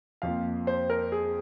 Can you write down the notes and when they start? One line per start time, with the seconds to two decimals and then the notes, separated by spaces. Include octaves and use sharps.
0.22 F2 F3 A#3 F5
0.67 C5
0.90 A#4
1.12 G#4